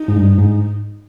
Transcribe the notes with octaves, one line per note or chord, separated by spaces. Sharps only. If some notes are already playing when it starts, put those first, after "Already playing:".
Already playing: D#4
G#2
G2
G#2